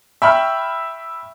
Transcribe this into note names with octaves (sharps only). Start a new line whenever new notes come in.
E5 G5 B5 C#6 F6